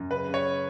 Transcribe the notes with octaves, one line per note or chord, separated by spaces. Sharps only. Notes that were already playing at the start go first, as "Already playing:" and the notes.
Already playing: F#2
C#3 B4
C#3
C#5